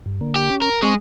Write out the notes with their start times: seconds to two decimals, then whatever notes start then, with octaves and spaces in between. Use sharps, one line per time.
0.06 G2
0.21 D3 A#3
0.36 G4
0.50 C#4
0.62 A#4
0.82 G#3 C4 G#4 C#6